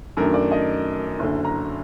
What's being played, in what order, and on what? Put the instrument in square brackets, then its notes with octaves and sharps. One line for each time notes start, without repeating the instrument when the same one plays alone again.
[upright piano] F#2 D#3 A3 D4 A#4
D5
D#5
F#1 F#2 D3
A#5